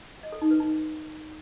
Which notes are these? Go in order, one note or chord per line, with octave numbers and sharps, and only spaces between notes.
D#5
A4
D#4
B4
D#4